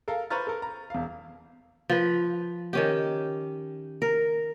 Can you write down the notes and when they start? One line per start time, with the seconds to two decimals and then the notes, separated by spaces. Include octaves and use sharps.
0.08 A4 A#4 F5
0.30 B4 C5 A#5 C#6 F6 A6
0.47 A4 A#4
0.62 A#5
0.90 E1 F5
1.90 F3 B4
2.73 D#3 C#4 G4
4.02 A#4